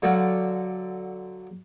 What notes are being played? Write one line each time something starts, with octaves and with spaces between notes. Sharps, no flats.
D3 F#3 F#4 A4 D5 F5